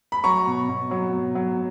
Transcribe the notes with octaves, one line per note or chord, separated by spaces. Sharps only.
B5
F#3 A#5 C#6
B2
B2
F#3
B2
F#3